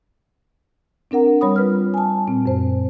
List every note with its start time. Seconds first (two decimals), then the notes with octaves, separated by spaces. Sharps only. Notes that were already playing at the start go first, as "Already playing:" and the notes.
1.11 C4 D4 A#4 F#5 A#5
1.41 G3 C#5 B5 D#6
1.56 F4 B4 F6
1.94 G#5 A5
2.27 A#2 C4
2.46 F#2 C5